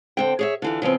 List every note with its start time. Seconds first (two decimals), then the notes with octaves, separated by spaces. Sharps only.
0.17 D3 C4 G5
0.39 G#4 C#5 E5
0.62 D3 E3 F4
0.82 C#3 F3 B3 C4